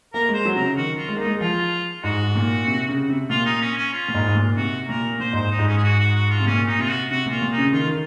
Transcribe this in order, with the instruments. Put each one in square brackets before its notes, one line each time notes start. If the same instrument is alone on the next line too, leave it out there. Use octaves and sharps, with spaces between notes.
[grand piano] A#3 [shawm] A#4
[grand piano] G#3
[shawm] C5
[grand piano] F#3
[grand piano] C3 [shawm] A#4
[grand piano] C#3
[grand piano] D#3 [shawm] F#4
[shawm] F4
[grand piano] G#3
[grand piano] A#3 [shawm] D#4
[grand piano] G#3
[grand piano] F3 [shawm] F4
[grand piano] G#2 [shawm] F#4
[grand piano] A#2
C3
C#3
C3
[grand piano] A#2 [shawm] F4
[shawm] D#4
C#4
C#4
F4
[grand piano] A#2
G#2
G#2
A#2
[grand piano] C3 [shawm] F#4
[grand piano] A#2 [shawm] A#4
[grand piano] A#2 [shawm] C5
[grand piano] G#2 [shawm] C5
[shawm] D#4
[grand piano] G#2
[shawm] C#4
G#4
F#4
F#4
F#4
F4
[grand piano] C3
[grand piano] A#2 [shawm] C#4
[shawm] D#4
[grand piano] C3 [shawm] F4
[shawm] F#4
[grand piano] C3 [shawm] F#4
[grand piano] A#2 [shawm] F4
[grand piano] A#2
[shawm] D#4
[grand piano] C#3
[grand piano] D#3 [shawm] F4
[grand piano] D#3